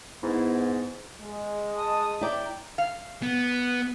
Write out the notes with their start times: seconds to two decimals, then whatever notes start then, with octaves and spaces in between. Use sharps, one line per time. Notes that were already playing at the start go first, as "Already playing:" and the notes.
0.23 G#2 B3 E4
1.21 G#3
1.76 A5 D#6
2.21 E4 D5 G5 A#5
2.78 F5
3.22 B3